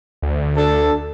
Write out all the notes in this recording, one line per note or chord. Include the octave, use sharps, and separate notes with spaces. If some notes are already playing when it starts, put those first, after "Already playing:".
D2
D4 A4